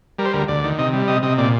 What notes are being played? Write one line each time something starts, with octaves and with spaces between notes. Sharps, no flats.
G3 A#4
C5
D2 A#4
D2 D5
D#3
C3 D#5
G3
C3 D#5
C3 D#5
A#2 D5